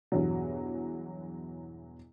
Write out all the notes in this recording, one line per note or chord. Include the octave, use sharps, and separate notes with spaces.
E2 G2 B2 E3 F#3